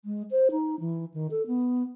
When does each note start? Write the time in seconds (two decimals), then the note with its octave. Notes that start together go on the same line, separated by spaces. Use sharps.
0.05 G#3
0.31 C5
0.51 D#4
0.80 E3
1.14 D#3
1.31 A4
1.47 B3